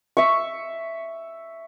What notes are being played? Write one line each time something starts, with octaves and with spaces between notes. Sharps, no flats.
E5 C#6